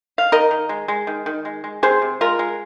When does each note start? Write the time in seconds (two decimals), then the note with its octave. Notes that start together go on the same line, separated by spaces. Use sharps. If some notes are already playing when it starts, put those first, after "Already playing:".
0.18 F5
0.32 D#3 A#4 D#5
0.51 D#3
0.69 G#3
0.88 G#3
1.07 D#3
1.26 D#3
1.45 G#3
1.64 G#3
1.83 C3 G#4 C5
2.02 C3
2.21 G#3 F4 A#4
2.39 G#3